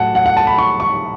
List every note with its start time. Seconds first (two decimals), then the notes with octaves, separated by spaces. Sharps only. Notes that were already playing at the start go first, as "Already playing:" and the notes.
Already playing: A2 F#3 F#5 A5
0.15 F#5
0.26 F#5
0.37 A5
0.47 B5
0.58 C#6
0.80 C#6